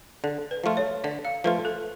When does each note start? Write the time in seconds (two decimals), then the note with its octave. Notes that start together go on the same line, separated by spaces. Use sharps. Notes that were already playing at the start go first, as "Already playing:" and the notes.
0.24 D3 A4
0.51 B4
0.64 F3 A3 F4
0.77 C#5
1.04 D3 D5
1.25 F5
1.44 F3 A3 F4 B4
1.65 A4